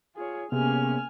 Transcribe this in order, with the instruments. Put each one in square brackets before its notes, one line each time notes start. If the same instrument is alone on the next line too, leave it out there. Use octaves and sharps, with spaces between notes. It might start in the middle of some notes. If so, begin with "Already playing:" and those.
[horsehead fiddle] F4 C#5 [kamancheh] G#4
[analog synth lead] C3 [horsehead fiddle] A#3 C#4 [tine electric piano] B3 G#4 [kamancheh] G#5 F6